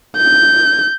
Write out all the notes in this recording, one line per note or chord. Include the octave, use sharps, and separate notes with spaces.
G6